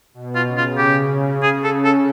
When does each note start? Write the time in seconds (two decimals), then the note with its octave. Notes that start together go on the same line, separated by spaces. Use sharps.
0.14 B2
0.35 F4
0.46 C#3
0.57 F4
0.78 G4
1.43 G#4
1.64 A4
1.85 A4